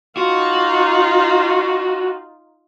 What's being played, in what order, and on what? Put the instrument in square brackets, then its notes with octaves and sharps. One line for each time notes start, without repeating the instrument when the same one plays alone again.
[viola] D#4 F4 [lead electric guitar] F#4